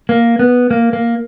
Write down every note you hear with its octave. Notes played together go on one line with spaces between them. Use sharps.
A#3
B3
A#3
A#3